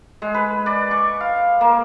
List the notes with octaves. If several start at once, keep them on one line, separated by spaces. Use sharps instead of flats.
G#3
B4
D5
C#6
F5
A#3